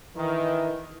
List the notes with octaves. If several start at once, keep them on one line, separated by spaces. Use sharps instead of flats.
D#3 E3